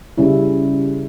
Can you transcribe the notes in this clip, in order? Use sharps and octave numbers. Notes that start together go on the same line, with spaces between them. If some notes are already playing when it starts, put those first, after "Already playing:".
C#3 G3 C#4 E4